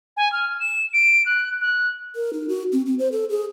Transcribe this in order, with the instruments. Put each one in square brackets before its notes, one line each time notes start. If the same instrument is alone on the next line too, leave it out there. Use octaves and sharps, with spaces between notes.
[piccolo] G#5
F6
E7
D7
F#6
F#6
[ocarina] A#4
D#4
F#4
C4
C4
C5
A4
G#4